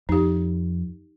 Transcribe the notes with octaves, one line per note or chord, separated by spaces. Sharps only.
F2 D#4 G4